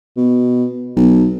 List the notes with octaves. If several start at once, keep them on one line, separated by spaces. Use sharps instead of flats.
B2
B1